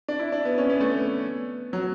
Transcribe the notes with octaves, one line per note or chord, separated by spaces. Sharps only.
D4
E4
D4
B3
C#4
B3
A3
B3
F#3